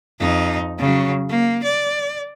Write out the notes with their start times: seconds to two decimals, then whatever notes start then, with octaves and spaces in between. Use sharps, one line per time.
0.19 F2 D#4
0.78 C#3 F#3
1.29 A#3
1.64 D5